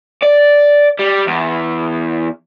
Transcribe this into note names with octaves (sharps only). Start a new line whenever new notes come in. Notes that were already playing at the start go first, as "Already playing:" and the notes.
D5
G3
E2